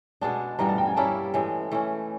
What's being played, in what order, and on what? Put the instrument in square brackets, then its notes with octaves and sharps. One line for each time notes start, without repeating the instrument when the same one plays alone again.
[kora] B2 G#3 B3 D4 [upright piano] A5
[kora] G2 E3 G3 B3 [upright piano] A#5
[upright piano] A5
G5
G#5
[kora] G3 A#3 C#4 E4 [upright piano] A5
[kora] A2 E3 G#3
E3 A3 C#4